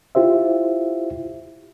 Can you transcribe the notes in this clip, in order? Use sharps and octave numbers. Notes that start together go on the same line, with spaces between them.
E4 F4 G4 C5 E5